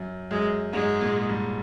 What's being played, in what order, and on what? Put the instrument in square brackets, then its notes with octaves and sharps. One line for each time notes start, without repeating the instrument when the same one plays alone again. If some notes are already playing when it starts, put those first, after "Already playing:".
Already playing: [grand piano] F#2
[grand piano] F#2 [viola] G#3
[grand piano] G#2 [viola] G#3
[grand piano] A#2
G2